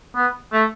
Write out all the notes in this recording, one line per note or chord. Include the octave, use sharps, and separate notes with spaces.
B3
A3